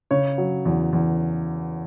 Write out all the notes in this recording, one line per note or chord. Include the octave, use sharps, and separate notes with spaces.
C#3 C#5
F#3
E2
E2